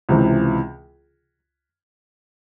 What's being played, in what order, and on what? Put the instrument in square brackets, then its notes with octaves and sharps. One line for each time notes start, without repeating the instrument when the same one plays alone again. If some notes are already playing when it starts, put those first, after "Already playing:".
[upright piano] C#2 C3 E3